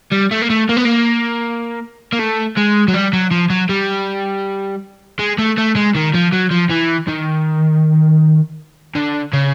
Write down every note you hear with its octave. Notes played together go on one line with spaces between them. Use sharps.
G3
A3
A#3
A3
A#3
B3
A#3
A#3
A3
G#3
F#3
G3
F#3
F3
F#3
G3
G#3
A3
A3
G#3
D#3
F3
F#3
F3
E3
D#3
D3
C#3